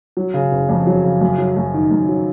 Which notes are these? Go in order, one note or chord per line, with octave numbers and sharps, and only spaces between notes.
F#3
C#3
F#1
F2
F#3
C#3
F#2
F#3
F#2
D#3
F#2
F#3